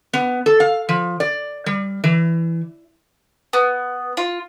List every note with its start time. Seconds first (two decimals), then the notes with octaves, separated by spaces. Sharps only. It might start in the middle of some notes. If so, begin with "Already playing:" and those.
0.13 B3
0.46 A4
0.60 F5
0.89 F3
1.20 D5
1.66 G3
2.04 E3
3.53 B3
4.17 F4